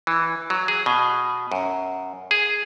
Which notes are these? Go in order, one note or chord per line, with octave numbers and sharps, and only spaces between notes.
E3
F#3
G#4
B2
F#2
G#4